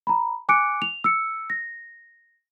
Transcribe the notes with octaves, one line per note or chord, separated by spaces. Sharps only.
A#5 B5
G#5 D6 F#6 C#7 D7
F7
E6 C#7
A#6